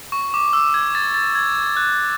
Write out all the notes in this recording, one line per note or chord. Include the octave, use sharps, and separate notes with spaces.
C#6
D6
E6
G#6
A6
A6
G#6
F#6